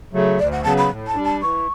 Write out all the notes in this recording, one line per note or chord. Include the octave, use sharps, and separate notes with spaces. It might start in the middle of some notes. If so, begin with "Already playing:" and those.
C#3 F#3 A3
D2 D5
F#5
C#3 F#3 B3 A5
B5
A2
A5
G3 D4
A5
E3 C#6